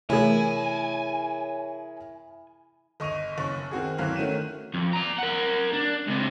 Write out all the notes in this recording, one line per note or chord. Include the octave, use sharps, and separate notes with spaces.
C3 E3 A3 E4 G#4 A#4 C#5 G#5
G1 D#5 C#6 D#7 F7
F#1 C#4 C#6
D#3 C4 F#4 G#4
G1 E3 F#3 C4 F5 F#6
D#3 A3 C#4 F#4 D#7 E7
F2
D5 A#5
A#4 F#5
D4
C#2 C3